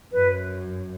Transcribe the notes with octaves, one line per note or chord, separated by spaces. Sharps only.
F#2 B4